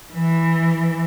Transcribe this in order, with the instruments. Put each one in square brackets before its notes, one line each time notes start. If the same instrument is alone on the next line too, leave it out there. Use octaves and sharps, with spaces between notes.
[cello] E3